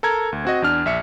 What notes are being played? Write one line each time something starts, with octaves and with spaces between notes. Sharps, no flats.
A4 A#4 A#5 G#6
D2
C4 F#4 D#5
E2 D4 F6
A#1 E5 C#7